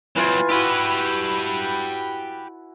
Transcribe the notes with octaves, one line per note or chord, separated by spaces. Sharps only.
E3 F#3 C4 F4 G#5
E4 F#4 G4 B4